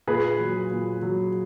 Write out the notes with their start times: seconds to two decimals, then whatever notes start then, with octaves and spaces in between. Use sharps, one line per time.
0.07 A#2 G#4 B4
0.40 F#3
0.71 A#2
1.02 F#3